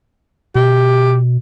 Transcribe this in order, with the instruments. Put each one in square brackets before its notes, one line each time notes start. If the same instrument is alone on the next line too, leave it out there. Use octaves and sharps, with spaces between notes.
[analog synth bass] B2 [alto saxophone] G4